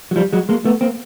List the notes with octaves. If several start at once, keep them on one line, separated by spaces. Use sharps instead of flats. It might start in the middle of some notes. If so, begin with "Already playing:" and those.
F#3
F3 G3
F#3 G#3
G#3 A#3
A3 B3
A#3 C4